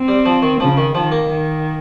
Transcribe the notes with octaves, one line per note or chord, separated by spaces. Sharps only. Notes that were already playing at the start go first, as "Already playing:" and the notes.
Already playing: C4
G3
F3
D#3
C#3 F3
D#3
D#3 F3
A#3
D#3